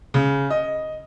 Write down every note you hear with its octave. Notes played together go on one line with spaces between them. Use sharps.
C#3
D#5